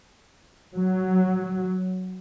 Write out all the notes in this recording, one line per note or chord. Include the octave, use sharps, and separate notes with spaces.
F#3